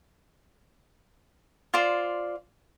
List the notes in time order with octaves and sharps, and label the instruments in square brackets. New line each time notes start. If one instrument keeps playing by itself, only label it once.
[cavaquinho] F4 C5 D5